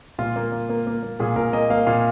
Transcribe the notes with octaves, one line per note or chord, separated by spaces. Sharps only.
A#2 F4
A#3
A#3
A#3
A#3
A#3
A#2 G#4
A#2 A#4
A#3 D#5
A#3 F5
A#2 F5